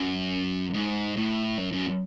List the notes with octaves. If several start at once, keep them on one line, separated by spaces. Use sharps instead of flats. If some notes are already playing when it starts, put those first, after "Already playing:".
Already playing: F#2
G#2
A2
F#2
F#2